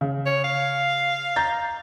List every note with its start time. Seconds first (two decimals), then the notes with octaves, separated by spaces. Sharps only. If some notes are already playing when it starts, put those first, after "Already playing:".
0.01 C#3
0.26 C#5
0.44 F5
1.36 A#5 G6 A6